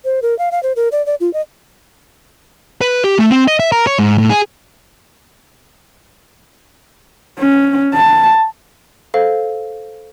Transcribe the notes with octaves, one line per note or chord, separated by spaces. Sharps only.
C5
A#4
F5
F5
C5
A#4
D5
D5
F4
D#5
B4
G4
A3
C4
D#5
E5
A#4
C#5
G#2
A2
G#4
C#4
A5
A4 C5 F5